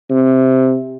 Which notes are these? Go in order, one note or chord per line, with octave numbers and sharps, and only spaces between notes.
C3